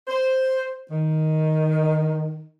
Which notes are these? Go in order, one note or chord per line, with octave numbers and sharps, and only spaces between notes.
C5
D#3